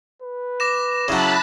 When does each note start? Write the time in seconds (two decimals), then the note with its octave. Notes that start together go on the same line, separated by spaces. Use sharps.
0.22 B4
0.60 D6 A#6 E7
1.08 C#3 F#3 E4 A5 B5 F#6